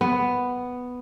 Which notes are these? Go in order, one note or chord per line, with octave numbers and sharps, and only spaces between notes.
B3